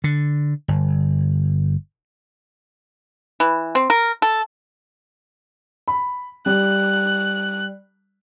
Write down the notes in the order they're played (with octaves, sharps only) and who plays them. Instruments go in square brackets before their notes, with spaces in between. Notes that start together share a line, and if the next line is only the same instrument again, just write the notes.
[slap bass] D3
G1
[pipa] E3
C4
A#4
A4
[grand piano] B5
[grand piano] G3 [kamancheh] F#6